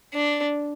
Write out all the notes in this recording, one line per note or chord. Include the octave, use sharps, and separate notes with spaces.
D4